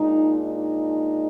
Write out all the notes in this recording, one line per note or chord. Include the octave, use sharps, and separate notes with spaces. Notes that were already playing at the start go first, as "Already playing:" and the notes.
Already playing: A#2 G#3 D4 D#4
D#4